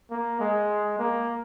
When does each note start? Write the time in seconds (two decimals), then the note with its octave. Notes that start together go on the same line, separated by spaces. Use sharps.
0.11 A#3
0.40 G#3
0.99 A#3